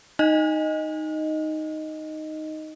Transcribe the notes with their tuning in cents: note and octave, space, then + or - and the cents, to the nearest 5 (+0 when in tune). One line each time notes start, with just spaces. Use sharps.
D#4 +0 D#5 +0